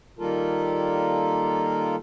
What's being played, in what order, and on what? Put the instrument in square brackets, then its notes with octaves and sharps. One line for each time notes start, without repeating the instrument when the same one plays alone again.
[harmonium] D#3 G3 A#3 F4 A4 A#4